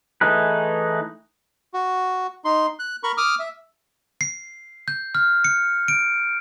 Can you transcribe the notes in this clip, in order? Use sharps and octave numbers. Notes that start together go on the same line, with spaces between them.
E3 A3 D#4 G#4 B4
F#4
D#4 C6
F#6
A#4 B5 C#6
D6 D#6 F6
E5
C7
G6
F6
C#7
D7